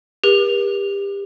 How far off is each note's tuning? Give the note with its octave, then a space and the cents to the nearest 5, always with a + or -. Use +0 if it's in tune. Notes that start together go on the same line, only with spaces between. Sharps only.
G4 +30 A#4 +45